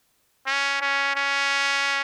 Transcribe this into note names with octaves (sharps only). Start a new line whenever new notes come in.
C#4
C#4
C#4